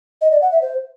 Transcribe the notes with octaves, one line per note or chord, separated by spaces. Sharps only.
D#5
D5
F#5
E5
C5